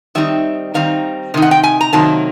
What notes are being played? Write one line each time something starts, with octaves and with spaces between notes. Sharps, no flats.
D#3 G3 C4 D#4 E5
D#3 G3 C4 D#4 F5
C3 D#3 D#4
F#5
G5
G#5
A#5
C3 D#3 F#3 A#3 D#4 A5